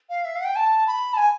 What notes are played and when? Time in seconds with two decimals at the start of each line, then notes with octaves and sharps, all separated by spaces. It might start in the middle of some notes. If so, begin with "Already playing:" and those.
0.09 F5
0.25 E5
0.35 F5
0.40 F#5
0.45 G5
0.56 A5
0.87 B5
1.13 A5
1.17 G#5